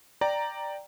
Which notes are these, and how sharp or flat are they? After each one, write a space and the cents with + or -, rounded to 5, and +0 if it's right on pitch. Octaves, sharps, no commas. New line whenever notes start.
D5 +5 G5 +0 A#5 +0